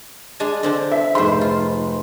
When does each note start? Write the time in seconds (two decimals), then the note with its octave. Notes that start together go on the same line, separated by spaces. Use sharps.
0.40 G#3 D4 G#5
0.63 D3 C4 D4
0.92 E5
1.15 F1 G#2 C5 B5 C6
1.41 F4